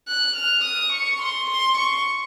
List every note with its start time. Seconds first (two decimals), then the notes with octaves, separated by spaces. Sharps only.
0.08 F#6
0.37 F6
0.64 D#6
0.93 C#6
1.22 C6
1.50 C6
1.78 C#6